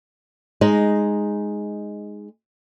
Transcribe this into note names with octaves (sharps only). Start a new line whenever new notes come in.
G#3 D#4